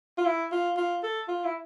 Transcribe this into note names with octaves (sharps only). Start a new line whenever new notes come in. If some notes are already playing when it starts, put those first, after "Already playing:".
F4
E4
F4
F4
A4
F4
E4